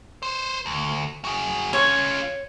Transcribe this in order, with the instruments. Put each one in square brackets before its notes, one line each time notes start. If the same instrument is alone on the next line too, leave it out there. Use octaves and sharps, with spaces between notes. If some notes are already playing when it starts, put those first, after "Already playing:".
[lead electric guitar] B4 C5
D2
F#4 G#4
[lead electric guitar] C#4 F4 [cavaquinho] C#5